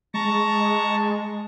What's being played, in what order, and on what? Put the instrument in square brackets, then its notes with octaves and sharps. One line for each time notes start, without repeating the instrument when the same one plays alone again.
[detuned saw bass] G#3 [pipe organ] A5 A#5 C#6